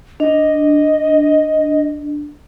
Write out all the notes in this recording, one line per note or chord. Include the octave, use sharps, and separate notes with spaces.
D4 D#5